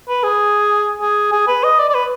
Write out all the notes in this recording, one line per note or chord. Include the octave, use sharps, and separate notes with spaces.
B4
G#4
G#4
G#4
B4
D#5
D5
D5
B4